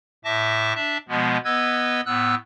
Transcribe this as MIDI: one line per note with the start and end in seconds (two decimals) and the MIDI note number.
0.25 0.73 45
0.25 0.73 76
0.25 0.73 81
0.25 0.73 86
0.25 0.73 94
0.75 0.98 62
0.75 0.98 76
0.75 0.98 81
1.09 1.38 47
1.09 1.38 53
1.09 1.38 56
1.09 1.38 59
1.45 2.01 59
1.45 2.01 71
1.45 2.01 75
1.45 2.01 88
1.45 2.01 92
2.06 2.35 45
2.06 2.35 59
2.06 2.35 88
2.06 2.35 90